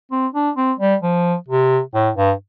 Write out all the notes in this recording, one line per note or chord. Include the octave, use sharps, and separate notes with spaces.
C4
D4
C4
G3
F3
C3
A2
G2